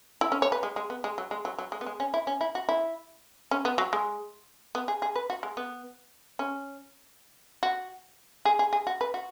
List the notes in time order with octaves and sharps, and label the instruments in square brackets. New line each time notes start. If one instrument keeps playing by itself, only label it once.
[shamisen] E4
C#4
C#5
B4
G#3
G#3
B3
G#3
F#3
G#3
F#3
F#3
G#3
B3
G#3
C#4
E4
C#4
E4
F#4
E4
C#4
B3
F#3
G#3
B3
G#4
G#4
B4
F#4
G#3
B3
C#4
F#4
G#4
G#4
G#4
F#4
B4
F#4